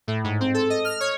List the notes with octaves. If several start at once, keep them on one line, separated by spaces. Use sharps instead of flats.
A2
G#2
C4
A4
D#5
F6
C#5